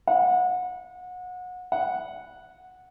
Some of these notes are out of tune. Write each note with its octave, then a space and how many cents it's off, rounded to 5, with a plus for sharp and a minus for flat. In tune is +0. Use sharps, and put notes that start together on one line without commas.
F#5 -30
F#5 -10